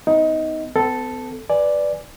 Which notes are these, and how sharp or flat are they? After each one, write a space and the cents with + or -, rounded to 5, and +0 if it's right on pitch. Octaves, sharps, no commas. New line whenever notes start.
B3 +40 D#4 +15
B3 +45 A4 +0
B4 +0 D5 +0 G#5 +5